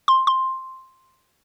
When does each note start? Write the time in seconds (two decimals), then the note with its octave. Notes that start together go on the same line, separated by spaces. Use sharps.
0.08 C6
0.27 C6